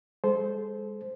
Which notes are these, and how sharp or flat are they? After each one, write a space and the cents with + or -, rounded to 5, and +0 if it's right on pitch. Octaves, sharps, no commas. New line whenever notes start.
G#3 -35 A4 -35 C5 -10